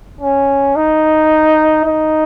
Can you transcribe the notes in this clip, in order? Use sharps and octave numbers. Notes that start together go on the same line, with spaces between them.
C#4
D#4
D#4